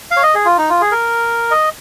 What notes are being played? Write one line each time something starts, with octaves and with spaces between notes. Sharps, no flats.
F5
C#5
D#5
G#4
F4
D#4
F4
G#4
A#4
D#5